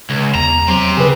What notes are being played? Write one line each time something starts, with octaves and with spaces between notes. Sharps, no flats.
C#2
E2 A#5
F#3 C4 G4
C#3 G#4 B4